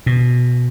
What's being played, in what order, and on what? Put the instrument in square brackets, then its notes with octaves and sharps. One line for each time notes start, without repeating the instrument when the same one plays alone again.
[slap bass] B2